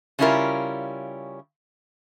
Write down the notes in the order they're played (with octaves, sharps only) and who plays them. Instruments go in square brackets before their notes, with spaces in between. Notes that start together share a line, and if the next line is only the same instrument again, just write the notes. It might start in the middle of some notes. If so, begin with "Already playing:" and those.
[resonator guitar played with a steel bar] C#3 G3 C#4 E4 F4 A#4